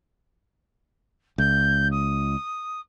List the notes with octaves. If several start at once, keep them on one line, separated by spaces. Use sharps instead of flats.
C#2 G6
D#6